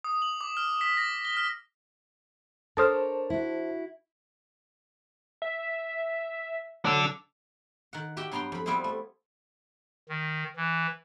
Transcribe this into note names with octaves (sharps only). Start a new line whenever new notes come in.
D#6
F#7
D6
F6
B6
A#6
G7
F6
D4 A4 A#4 C5 C#5 A5 D#6 F6
E4 F#4
E5
F#3 D4 A4
D#3 F#5
F#4 G4 E5 F#5 G5
G2 F#3 B3 G5 A#5 C6
F2 B5
G3 B3 C4 E4 F4 G#4
A3
D#3
E3